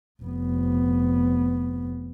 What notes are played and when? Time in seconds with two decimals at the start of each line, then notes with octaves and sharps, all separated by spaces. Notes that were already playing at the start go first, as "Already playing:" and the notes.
0.22 F1 B3